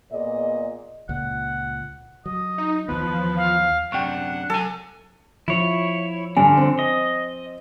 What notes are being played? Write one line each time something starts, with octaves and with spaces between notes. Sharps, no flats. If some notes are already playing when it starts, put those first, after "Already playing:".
A#2 B3 G#4 D5 D#5
C#2 A#2 F#5
F#3 D#5
D#4
D#2 E3 F3 B3 B4
F5
F#2 C3 D4 F#5 G5 C#6
F#3 A4 G#5
F3 E4 F4 C#5
G2 D3 G#5
C4
D#5